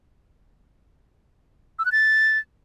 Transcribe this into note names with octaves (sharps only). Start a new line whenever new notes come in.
E6
F#6
A6